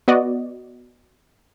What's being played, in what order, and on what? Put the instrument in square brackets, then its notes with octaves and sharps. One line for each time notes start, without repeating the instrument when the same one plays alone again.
[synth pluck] B3 F#4 D5 D#5